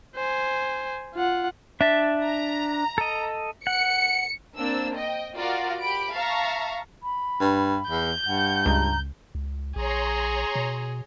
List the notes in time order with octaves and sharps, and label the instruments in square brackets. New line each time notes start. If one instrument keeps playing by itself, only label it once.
[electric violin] C5 G#5
F4 F#5
[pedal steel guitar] D4 A5 [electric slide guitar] E5
[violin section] A#5
[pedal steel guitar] A4 D#5
[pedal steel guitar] F#5 [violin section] C#7
[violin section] A#3 C4 D4 E6
D#5 G5
F4 F#4 A#4 D5 F5
G4 B5 D7
E5 F5 A5 A#5 C#6
[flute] B5
[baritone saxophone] G2
[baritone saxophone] E2 [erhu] G6
[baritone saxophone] G2 [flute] F#5
[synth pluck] C#2 [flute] A#5
[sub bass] C#2
[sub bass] A#1 [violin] G#4 [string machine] C#5 A#5 C6
[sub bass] B2